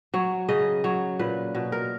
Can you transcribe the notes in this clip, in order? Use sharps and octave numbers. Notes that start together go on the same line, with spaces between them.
F#3 C#5
C#3 D#5
F#3 C#5
A#2 B4
B2
A#4